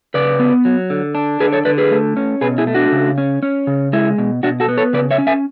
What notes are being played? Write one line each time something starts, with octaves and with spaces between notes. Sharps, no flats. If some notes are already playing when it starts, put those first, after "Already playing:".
C#3 B4 D5
B3
F#3
D3
D4
D3 G#4 B4
A4 C#5
D3 B4 D5
G#4 B4
A3
C#4
B2 G#4 B4
E4 G#4
A3
D4 F#4
C#3
C#4
C#4
C#3
G#3 E4
B2
B2 D4 F#4
F#4 A4
B3
A4 C#5
C#3 B4 D5
C#5 E5
C#4
E5 G#5